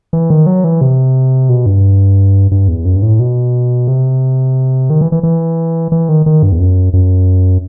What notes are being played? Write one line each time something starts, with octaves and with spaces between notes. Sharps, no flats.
E3
D#3
F#3
E3
C3
B2
G2
G2
E2
F#2
G2
A2
B2
C3
D#3
E3
E3
E3
E3
D#3
D#3
G2
E2
F#2
F#2